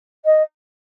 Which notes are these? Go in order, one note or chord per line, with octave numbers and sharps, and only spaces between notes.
D#5